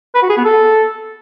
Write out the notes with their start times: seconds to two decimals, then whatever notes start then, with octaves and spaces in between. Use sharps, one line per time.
0.15 B4
0.22 F#4
0.30 G#4
0.37 B3
0.45 A4